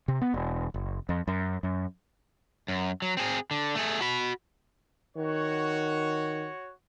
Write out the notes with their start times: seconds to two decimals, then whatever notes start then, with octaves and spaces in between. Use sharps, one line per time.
0.08 C3
0.21 B3
0.34 E1
0.74 F#1
1.09 F2
1.28 F#2
1.63 F#2
2.68 F#2
3.02 F#3
3.17 C4 G#4
3.51 D3
3.75 A3 G#4
4.01 F#4 B5
5.17 D#3 F#4 C#5